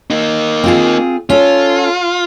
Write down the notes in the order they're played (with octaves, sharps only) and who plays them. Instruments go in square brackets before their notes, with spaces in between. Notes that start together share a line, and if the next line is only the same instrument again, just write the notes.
[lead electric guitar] A#3 D#4
[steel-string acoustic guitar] C4 F4 G#4
[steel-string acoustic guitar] C#4 A4 [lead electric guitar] F4